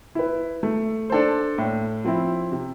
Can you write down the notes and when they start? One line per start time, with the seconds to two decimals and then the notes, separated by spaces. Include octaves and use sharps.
0.15 E4 B4
0.63 A3
1.10 D4 A4 C5
1.58 A2
2.05 F3 C4 E4
2.52 C3